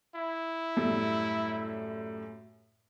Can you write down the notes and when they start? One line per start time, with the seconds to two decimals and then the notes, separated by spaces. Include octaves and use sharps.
0.15 E4
0.76 F#2 A2 G3